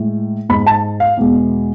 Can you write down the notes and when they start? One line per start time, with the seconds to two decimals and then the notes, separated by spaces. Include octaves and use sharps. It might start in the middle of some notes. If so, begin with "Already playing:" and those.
Already playing: A2 G#3
0.49 G#2 G#3 B5
0.67 A5
1.00 F5
1.17 E2 B2 G#3